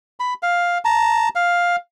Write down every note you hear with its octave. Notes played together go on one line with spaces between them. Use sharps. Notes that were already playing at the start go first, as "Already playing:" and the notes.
B5
F5
A5 A#5
F5